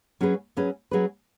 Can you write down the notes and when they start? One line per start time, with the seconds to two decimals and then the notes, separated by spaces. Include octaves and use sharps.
0.21 F#3 C#4 G#4 B4
0.57 F#3 C#4 G#4 B4
0.91 F#3 C#4 G#4 B4